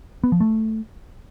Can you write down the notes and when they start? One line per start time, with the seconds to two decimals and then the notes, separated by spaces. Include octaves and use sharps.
0.24 B3
0.32 F3
0.40 A3